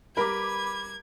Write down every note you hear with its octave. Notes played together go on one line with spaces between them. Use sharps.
G3 A#4 B4 B5 D6 G#6 B6